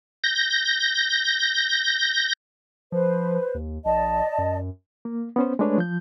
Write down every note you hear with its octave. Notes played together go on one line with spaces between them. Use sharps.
G6 A#6
F3 B4 C5
D#2
A#1 D5 D#5 A5
F#2
A#3
B3 C#4 C5
G#3 A3 D4 B4 C#5
F3 G6